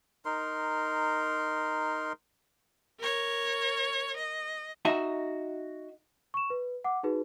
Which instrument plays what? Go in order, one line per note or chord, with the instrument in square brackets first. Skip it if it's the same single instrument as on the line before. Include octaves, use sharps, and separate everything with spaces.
[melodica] D#4 A#4 C6
[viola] A#4 C#5
D#5
[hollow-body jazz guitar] D#4 F#4 E5
[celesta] C#6 E7
B4
F#5 D6
D#4 F#4 G#4 B4